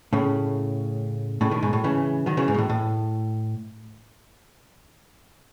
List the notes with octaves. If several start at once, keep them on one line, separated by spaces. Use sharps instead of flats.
A2 C#3
A2 C#3
B2 D#3
G#2 B2
A2
C#3 E3
D#3 F#3
C#3 E3
G#2
B2
A2
A2